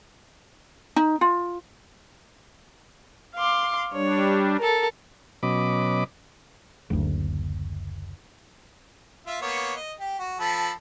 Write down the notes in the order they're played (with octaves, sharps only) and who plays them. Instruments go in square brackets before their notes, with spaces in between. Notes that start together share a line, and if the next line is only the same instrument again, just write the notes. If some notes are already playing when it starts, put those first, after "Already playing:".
[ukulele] D#4
F4
[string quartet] F5 C6 D6
[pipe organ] G3 D4 [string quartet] C#5
[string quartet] A4 A#4
[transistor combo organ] B2 F#3 C#4 D#5 B5 D6
[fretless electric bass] F#1 D2
[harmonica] F4 E5
A#3 B3 C#5
D#5
G4
F#4
F3 A4 B5